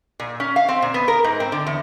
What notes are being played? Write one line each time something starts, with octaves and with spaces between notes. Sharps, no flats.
A#2
C#4
F5
C4
A#2
B3
A#4
G#2
C4
D3
E2